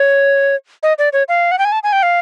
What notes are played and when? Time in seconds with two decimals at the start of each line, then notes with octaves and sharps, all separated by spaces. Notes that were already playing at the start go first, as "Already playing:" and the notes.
Already playing: C#5
0.83 D#5
0.99 D5
1.13 C#5
1.28 F5
1.52 F#5
1.59 G5
1.65 G#5
1.72 A5
1.83 G#5
1.93 G5
2.03 F5